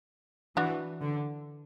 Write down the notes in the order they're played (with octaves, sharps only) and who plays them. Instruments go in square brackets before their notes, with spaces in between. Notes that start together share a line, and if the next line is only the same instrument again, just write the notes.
[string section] E3 [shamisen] D4 F#4
[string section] D3